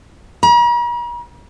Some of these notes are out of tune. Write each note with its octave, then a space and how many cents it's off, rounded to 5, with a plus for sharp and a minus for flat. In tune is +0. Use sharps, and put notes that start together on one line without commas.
A#5 +45